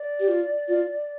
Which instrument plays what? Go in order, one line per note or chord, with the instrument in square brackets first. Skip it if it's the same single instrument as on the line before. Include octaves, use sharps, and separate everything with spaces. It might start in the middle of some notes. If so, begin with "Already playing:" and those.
Already playing: [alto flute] D5
[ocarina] G4
F4
F4